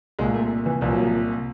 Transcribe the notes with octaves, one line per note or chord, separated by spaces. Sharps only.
C2 A#2 G#3
A3
E3
C2 A#2 F3
F#3
F3